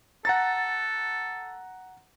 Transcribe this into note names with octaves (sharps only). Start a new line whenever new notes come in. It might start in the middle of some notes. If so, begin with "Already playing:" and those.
A4 F#5 A#5 A6